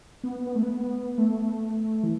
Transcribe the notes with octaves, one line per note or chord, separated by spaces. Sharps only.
B3
B3
A3
B3
A3
E3